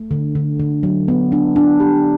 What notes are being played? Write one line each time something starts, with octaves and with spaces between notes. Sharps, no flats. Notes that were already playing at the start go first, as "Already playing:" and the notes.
Already playing: A3
D3
D3
D3
F#3
B3
D4
D4
G4